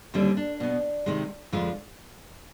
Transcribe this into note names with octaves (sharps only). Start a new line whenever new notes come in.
D#2 D3 G3 C4
D4
B2 B3
C3 D#3 G#3
F2 D3 G#3 F4